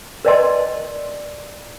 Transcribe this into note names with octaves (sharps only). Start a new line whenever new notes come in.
A#4 B4 D5 D#5 A5 C6